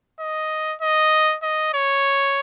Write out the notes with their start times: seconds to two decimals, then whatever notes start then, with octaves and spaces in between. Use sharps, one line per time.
0.20 D#5
0.81 D#5
1.43 D#5
1.74 C#5